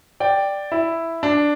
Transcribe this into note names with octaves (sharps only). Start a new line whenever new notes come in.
D5 G5
E4
D4